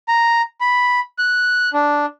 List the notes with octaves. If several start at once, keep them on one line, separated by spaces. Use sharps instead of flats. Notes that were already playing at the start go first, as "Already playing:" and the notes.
A#5
B5
F#6
D4